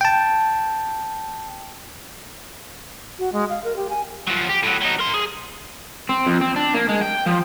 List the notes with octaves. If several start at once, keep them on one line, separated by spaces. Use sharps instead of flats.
G5 A5
F#4
G#3
F5
A#4
G4
G#5
F3 F#3
G4
A2 F#3
F#3 D#4
A#4 C6
G#4
C4
F2
C4
D4
A#3
G#3
G5
F3